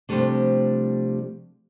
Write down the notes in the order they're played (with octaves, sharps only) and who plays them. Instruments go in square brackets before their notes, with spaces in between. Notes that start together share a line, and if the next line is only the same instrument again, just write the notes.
[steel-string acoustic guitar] C3 E3 F3 G3 A3 D4